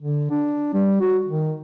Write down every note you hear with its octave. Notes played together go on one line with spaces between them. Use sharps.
D3
D4
G3
F#4
D#3